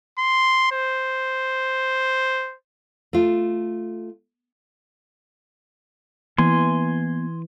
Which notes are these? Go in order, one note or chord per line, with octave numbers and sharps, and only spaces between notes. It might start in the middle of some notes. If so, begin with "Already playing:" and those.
C6
C5
A3 F4
E3 A#3 B3 G#5 C6